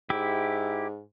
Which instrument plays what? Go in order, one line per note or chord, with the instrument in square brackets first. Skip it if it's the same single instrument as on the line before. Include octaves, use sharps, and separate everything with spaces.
[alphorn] G#2 [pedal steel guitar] E4 G4 E5